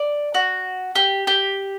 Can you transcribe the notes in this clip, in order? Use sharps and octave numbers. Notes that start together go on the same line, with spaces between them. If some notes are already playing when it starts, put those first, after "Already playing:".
Already playing: D5
F#4
G4
G4